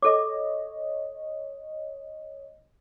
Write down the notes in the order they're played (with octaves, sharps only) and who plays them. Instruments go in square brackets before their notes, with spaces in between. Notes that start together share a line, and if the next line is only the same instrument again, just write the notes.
[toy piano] A4 D6 [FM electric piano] C#5 D#5